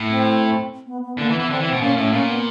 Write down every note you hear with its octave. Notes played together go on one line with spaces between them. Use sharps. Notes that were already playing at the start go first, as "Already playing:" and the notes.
Already playing: A2
C4
B3
B3
D3 A#3
E3
B3
E3
D3 C4
E3
B2 C4
A#2 C#4
A2 C#4
A#2 C#4
B3